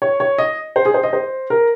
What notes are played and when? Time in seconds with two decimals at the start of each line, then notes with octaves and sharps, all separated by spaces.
0.02 C#5
0.20 C#5
0.38 D#5
0.76 C5
0.85 G#4
0.94 C5
1.03 D#5
1.13 C5
1.50 A#4